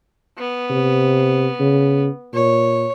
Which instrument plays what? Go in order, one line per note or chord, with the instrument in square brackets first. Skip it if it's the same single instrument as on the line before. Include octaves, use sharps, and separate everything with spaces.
[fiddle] B3
[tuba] C3
C#3
[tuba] A#2 [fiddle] C#5